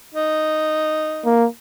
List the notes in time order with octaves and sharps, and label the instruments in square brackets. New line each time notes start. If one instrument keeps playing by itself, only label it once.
[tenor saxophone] D#4
[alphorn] A#3